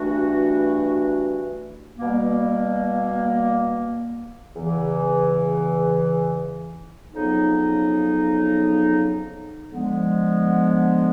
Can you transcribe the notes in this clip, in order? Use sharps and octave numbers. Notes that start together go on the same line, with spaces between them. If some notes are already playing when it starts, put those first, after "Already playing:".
Already playing: G2 E3 A3 D4 F#4
B2 G3 A#3
E2 C#3 E3
F2 C#3 F#3 B3 D#4
D3 F3 G#3 B3